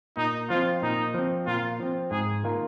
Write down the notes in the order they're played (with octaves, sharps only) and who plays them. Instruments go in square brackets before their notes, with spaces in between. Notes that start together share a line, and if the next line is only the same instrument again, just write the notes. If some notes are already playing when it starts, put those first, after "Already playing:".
[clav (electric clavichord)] A#2 [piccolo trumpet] D#4
[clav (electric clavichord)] F3 C4 [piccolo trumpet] F4
[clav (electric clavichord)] A#2 [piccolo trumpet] D#4
[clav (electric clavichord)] F3 C4
[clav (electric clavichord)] A#2 [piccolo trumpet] F4
[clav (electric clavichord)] F3 C4
[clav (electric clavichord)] G#2 [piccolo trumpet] G#4
[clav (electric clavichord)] D#3 A#3 F4 A#4